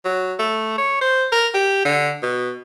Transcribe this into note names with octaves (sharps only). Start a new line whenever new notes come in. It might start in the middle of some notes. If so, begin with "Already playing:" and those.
F#3
A3
C#5
C5
A#4
G4
D3
B2